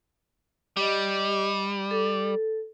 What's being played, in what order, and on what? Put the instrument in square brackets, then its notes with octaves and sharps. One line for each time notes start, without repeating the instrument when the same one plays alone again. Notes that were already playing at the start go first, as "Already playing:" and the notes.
[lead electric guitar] G3 [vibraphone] G4 D#5
[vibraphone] A4